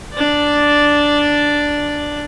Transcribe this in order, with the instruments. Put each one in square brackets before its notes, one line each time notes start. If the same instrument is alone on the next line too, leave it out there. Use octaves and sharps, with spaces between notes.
[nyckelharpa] D4 D5